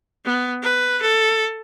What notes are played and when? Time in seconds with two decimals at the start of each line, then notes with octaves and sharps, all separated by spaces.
0.25 B3
0.62 B4
1.01 A4